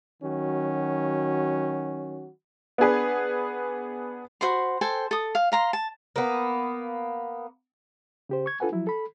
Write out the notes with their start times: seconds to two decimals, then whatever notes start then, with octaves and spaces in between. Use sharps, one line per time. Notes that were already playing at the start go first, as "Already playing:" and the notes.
0.22 D#3 F#3 C#4 F#4
2.78 B3 D4 G#4 B4
4.41 F#4 C5 B5 C6
4.81 A4 C5 G5 G#5
5.11 A4 D#6
5.35 F5
5.52 F5 A#5 C6
5.73 A5
6.16 A#3 B3
8.29 C#3 G4 C5
8.46 C#6 G#6
8.60 D4 F4 A4 B4 F#5 G#5
8.72 F3 F#3 E4
8.87 A4 B5